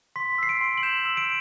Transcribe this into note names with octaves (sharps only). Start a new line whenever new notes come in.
C6 B6
E6 C7
D7
C6
F#7
G6 E7
E6
D7